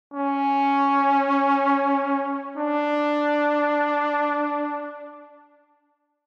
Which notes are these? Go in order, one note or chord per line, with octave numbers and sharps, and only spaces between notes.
C#4
D4